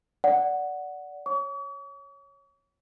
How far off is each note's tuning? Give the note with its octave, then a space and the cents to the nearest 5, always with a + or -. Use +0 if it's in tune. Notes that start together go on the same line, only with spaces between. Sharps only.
D5 -15 F#5 +0
C#5 -10 C#6 +45